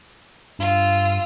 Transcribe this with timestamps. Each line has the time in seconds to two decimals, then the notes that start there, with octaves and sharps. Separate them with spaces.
0.59 G2 F4 E6